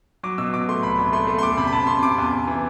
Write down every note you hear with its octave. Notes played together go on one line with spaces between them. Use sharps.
F#3 D6
B2 E6
B2 D6
A3 C6
C2 B5
C2
A3 C6
A3
C6
E2 D6
C3 B5
B5
C3 A5
C3 C6
C3 D6
E2
E2
E3